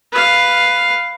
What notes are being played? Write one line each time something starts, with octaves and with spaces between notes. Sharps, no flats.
B4 F5